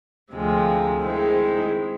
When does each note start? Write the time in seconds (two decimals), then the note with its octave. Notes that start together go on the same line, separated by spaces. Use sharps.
0.32 D2 C3 F3 G#3
1.03 D#3 G#3 C4 E4